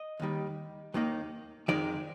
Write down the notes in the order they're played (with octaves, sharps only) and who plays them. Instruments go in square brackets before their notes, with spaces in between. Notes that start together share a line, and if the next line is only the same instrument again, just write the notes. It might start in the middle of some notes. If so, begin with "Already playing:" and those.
Already playing: [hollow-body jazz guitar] D#5
D#2 D#3 G3
D#2 D#3 A#3 D#4
F2 D#3 G#3 D#4 D5